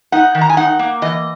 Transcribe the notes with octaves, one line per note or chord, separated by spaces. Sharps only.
D#4 F#5
D#3
A#5
G#5
D#4 F#5
A#3
E3 D#5